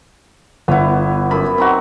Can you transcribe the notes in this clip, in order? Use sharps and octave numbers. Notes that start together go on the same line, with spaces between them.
G1 B3 E4
F#2 B5
C4 D#4 F#4